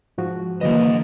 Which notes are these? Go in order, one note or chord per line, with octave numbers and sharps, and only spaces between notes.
G#2 F3 F#4
D3 E3 F#3 A#3 B4 C5 D#5